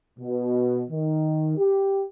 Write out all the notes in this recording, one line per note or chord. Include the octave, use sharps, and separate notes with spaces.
B2
D#3
G4